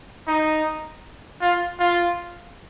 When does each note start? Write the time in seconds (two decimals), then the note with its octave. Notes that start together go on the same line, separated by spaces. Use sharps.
0.28 D#4
1.42 F4
1.79 F4